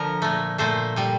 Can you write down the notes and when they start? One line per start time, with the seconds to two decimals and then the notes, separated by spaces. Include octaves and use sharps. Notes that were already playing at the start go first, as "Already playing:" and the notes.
Already playing: D3 F3 A#4
0.22 A#2 A3
0.58 A#2 A3 C5
0.96 A#2 G3